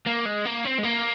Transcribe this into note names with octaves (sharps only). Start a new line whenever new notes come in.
A#3
G#3
A#3
C4
G#3
A#3